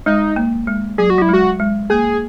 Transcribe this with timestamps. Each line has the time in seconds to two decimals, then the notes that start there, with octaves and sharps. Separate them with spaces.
0.06 G#3 D#4
0.36 A#3
0.67 G#3
0.98 F#3 G#4
1.10 F#4
1.18 F#3 E4
1.29 G#3 F#4
1.60 G#3
1.90 A#3 G#4